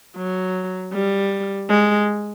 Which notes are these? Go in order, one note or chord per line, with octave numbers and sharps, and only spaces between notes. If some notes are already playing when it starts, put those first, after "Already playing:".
F#3
G3
G#3